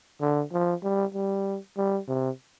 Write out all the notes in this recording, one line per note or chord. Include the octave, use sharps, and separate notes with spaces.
D3
F3
G3
G3
G3
C3